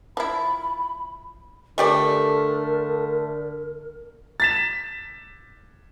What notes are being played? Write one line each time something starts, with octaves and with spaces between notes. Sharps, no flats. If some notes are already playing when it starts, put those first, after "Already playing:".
F3 E4 B5
D3 A3 G4 A#4 D5
A6 B6 E7